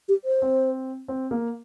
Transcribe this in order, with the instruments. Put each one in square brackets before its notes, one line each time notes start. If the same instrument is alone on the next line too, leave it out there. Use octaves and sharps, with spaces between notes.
[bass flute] G4
C5
[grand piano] C4
C4
A#3